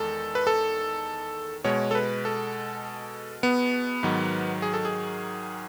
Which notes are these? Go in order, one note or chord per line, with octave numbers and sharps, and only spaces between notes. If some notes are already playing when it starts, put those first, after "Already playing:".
Already playing: E2 D#3 G#3 A4
B4
A4
B2 G#3 C#5
A4
B4
A4
B3
G#2 D#3 F#3
G#4
A4
G#4